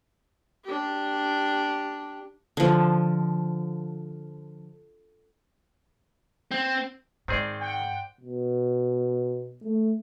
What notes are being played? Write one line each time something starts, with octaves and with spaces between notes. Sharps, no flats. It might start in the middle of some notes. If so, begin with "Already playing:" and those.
D4 G4
D3 F3
C4
G#2 D#3 C4 G#4 C5 D5
F#5 G5
B2
A3